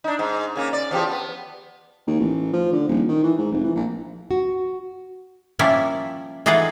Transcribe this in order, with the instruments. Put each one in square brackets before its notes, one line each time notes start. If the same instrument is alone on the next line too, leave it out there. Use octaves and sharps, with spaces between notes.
[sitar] D4 D#4
G#2
C#3 A#3 C#4
D5
E2 F3 G4
B3
[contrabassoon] D#2
A1
F3
D3
D#1
D#3
E3
G#2
F1
E3
A#1
[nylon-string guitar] F#4
[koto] F3 G3 A#3 C#4 E4
E3 D#4 F4 G#4 A4 F#5